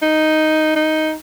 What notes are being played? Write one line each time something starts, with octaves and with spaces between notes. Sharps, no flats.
D#4
D#4